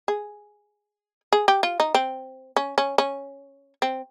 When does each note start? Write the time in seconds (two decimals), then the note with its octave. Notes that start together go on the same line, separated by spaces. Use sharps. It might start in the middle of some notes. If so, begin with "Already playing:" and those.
0.08 G#4
1.33 G#4
1.48 G4
1.63 F4
1.80 D#4
1.94 C4
2.56 C#4
2.78 C#4
2.98 C#4
3.82 C4